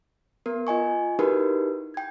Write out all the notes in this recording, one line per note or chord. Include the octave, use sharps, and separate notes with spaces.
B3 A#4
F4 D#5 G#5 C#6
D#4 E4 F#4 G4 A#4 B4
G5 G#6